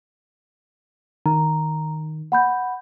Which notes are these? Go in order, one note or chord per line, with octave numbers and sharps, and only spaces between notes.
D#3 A#5
F#5 B5 G6